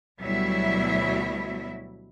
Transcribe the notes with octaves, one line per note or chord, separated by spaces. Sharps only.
D2 B2 F#3 G3 E4 E5